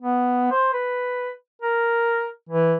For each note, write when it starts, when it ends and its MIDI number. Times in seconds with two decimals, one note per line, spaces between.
0.02 0.49 59
0.51 0.72 72
0.74 1.31 71
1.62 2.29 70
2.49 2.76 52